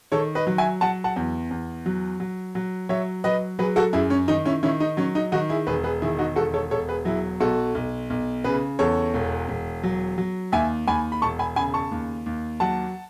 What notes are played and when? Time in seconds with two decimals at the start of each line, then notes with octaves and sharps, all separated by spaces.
0.12 D#3 A4 C#5
0.35 B4 D#5
0.47 F#3
0.58 E5 G#5
0.81 F#3 F#5 A5
1.04 F#5 A5
1.16 E2
1.51 E2
1.86 F#3
2.20 F#3
2.55 F#3
2.89 F#3 C#5 E5
3.24 F#3 B4 D#5
3.59 F#3 G#4 B4
3.76 F#4 A4
3.93 F#2 E4 G#4
4.10 C#4
4.28 D#3 D#4
4.45 C#4 E4
4.63 D#3 C#4 E4
4.80 D#4
4.97 F#3 C#4
5.15 D#4
5.32 D#3 D#4 F#4
5.49 E4 G#4
5.67 E1 G#4 B4
5.84 G#4 B4
6.02 D#3 E4 G#4
6.19 D#4 F#4
6.36 E1 F#4 A4
6.54 A4 C#5
6.71 E1 A4 C#5
6.88 G#4 B4
7.05 F#3 E4 G#4
7.40 B1 F#4 A4
7.75 B1
8.10 B1
8.44 C#3 G#4 B4
8.79 E2 A4 C#5
9.14 E1
9.49 E1
9.83 F#3
10.18 F#3
10.52 D#2 E5 G#5
10.87 D#2 G#5 B5
11.12 B5
11.22 E1 A5 C#6
11.39 G#5 B5
11.56 C#3 G#5 B5
11.74 A5 C#6
11.91 D#2
12.26 D#2
12.60 F#3 F#5 A5